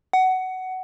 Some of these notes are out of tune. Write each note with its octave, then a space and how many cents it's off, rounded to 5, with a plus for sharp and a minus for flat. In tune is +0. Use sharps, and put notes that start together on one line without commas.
F#5 +15